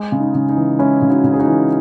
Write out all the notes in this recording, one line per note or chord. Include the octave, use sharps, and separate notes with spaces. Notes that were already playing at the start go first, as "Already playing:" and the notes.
Already playing: G#3
C#3
D#4
C#3
D#4
E3
G#3 C#4 E4
C#3
D#4 F#4
C#3
G#4
D#4 F#4
E3